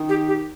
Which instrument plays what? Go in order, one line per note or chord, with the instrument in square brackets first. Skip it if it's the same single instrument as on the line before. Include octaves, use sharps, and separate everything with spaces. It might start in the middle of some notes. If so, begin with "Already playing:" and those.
Already playing: [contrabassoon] D#3
[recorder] G4
G4